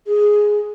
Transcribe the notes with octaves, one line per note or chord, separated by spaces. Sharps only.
G#4